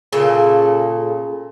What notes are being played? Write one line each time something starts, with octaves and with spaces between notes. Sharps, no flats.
A#2 C#3 A4